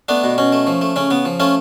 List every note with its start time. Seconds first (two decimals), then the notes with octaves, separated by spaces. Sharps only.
0.08 A3 B3 D4
0.24 B2
0.38 B2 C#4
0.53 A3
0.67 F3
0.81 A3
0.96 C#3 C#4
1.10 C#3 B3
1.25 F3
1.40 A3 C#4 F4